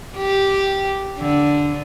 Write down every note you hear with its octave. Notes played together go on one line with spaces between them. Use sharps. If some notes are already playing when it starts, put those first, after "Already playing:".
G4
D3